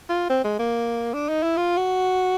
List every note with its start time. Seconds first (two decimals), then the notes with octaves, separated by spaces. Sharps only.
0.09 F4
0.30 C4
0.44 G#3
0.59 A#3
1.14 D4
1.29 D#4
1.43 E4
1.57 F4
1.77 F#4